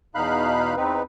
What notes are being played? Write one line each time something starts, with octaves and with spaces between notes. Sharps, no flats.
E2 B2 D#4 F5 B5 F#6
E2 C4 D#4 B4